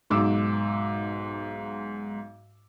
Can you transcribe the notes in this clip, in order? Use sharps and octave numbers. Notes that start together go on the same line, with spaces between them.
B1 G#2 D6 E6